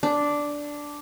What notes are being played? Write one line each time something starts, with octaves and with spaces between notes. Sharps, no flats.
D4